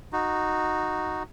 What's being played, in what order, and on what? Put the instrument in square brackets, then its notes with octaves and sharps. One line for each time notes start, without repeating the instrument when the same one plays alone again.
[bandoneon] D#4 F#4